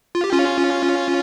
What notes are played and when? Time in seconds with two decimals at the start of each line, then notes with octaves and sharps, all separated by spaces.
0.15 F4
0.24 G4
0.33 C#4 F4